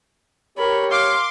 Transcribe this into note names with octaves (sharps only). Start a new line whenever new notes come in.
G4 A#4 C#5 B5
F5 C6 D6